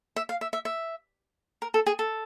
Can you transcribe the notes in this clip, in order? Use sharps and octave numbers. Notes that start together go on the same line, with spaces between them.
E5
F5
E5
E5
E5
A#4
A4
G#4
A4